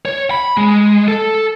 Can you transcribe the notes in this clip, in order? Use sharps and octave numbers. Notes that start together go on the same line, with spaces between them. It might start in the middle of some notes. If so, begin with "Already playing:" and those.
C#5
B5
G#3
A4